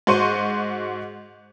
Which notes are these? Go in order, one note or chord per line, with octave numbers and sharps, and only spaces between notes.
G#2 F#4 C5 C6 C#6 D#7